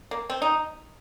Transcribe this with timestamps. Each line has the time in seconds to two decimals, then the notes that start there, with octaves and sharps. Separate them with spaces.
0.11 A#3
0.30 C4
0.42 D#4